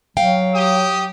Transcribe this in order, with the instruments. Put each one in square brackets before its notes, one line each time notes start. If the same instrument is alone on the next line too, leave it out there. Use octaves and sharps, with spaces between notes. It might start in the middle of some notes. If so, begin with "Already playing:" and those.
[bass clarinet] F#3 [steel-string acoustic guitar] F5 G5
[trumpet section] G4 D#6